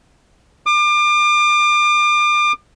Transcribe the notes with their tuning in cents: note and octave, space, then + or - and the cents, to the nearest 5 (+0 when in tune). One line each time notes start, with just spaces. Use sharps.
D6 +35